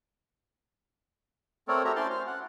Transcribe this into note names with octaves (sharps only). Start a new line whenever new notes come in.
A3 C4 A4 A#4 C#5 D5
F#4 G4 A4 C#5 E5 A#5
C#4 E4 C5 D5 A5 C6
C5 F6
F#5